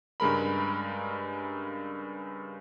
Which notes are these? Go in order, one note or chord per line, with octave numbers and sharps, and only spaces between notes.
G2 C#3 G#3 A#4 B5